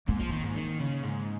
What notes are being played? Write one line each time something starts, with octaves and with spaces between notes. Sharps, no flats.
G#2 A#3
F3
D#3
G#2
D#3
C#3
G#2